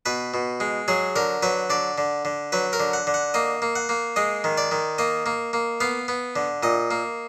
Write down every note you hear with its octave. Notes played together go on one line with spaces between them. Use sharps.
B2 B4
B2
G#3
F#3 G#4
D3 A#4
F#3 B4
D3 D5
D3
D3
F#3 B4
A#4
D3
F#5
D3
F#5
A#3 D#5
A#3
F#5
A#3
G#3 D#5
D#3
D5
D#3
A#3 D#5
A#3
A#3
B3 F5
B3
D3
A#2 D#5
A#3